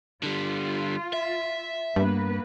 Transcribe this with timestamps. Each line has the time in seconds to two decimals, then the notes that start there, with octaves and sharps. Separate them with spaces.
0.23 D3 G3 F4
1.13 E5
1.96 G2 A#3 B3 B4